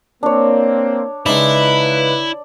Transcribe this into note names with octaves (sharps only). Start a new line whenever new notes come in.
A#3 C4 D4 C#5
C#3 G#3 D#4 E4 B4 D5